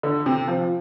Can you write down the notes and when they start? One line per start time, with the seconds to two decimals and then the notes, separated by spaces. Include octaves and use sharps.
0.03 D3
0.26 C3
0.48 F3